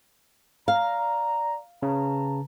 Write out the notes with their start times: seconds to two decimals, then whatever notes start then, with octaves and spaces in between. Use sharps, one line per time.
0.68 D5 F5 A#5
1.83 C#3 B4 A5 A#5